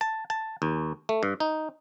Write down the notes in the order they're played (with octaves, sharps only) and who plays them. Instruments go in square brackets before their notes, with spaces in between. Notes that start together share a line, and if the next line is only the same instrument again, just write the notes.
[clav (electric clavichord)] A5
A5
D#2
A3
G2
D#4